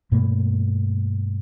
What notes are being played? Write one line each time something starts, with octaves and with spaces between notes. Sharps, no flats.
G2 B2 A3 A#3